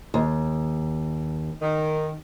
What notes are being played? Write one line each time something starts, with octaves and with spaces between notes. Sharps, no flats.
D#2
D#3